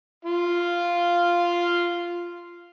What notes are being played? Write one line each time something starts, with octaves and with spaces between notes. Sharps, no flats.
F4 F5